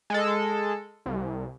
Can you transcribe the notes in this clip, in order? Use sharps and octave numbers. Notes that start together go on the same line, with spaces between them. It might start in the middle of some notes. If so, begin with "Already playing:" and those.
G#3 A4
C2